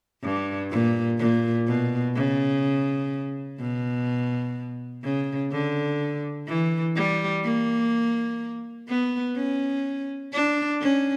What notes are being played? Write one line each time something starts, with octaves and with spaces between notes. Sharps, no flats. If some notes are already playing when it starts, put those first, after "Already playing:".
G2
A#2
A#2
B2
C#3
B2
C#3
D3
E3
G3
A#3
B3
C#4
D4
C#4